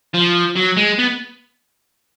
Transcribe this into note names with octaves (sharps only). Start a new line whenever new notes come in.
F3
F#3
G#3
B3